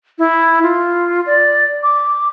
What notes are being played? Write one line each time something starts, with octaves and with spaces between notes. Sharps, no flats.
E4
F4
D5
D6